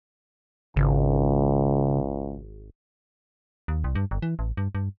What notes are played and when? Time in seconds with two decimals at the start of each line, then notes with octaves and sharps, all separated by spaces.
0.76 G#1 C#2 C#3
3.68 D#2
3.84 C2
3.95 G2
4.11 G1
4.22 E3
4.39 A1
4.57 G2
4.75 G2